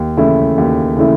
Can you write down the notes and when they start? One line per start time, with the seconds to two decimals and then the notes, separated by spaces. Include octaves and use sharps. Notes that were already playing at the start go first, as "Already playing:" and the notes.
Already playing: D#2
0.17 C#3 E3 A3 E4
0.58 D#2
0.97 C#3 E3 A3 E4